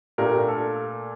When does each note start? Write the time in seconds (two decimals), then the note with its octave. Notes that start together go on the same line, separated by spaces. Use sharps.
0.18 A#2 A3 D4 G4 A#4
0.48 A4